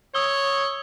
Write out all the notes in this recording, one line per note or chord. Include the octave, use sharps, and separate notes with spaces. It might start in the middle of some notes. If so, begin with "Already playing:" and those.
C#5 D#6 E6 G7